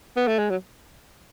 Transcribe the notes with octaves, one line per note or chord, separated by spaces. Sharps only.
B3
A3
G#3
F#3